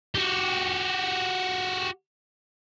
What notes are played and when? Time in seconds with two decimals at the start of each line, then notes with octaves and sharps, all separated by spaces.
0.15 F#4 G4